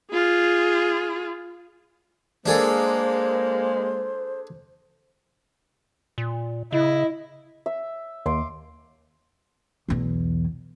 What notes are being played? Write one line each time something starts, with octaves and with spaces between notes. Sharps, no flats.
F4 G#4
G#3 A#3 D4 G#4 A4 C5
A#2
C#3 E4 D#5
E5
D#2 C6 D6
B1 E2